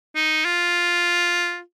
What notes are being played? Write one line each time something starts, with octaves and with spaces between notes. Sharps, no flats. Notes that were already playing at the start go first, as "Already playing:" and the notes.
D#4
F4